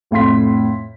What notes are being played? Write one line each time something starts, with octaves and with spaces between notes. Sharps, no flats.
F2 A2 F5 C6 B6